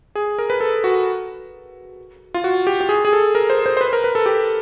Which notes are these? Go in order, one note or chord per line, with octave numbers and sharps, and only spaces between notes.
G#4
A#4
B4
A4
F#4
F4
F#4
G4
G4
G#4
G#4
A4
A#4
C5
C5
C5
B4
A#4
B4
A4
G4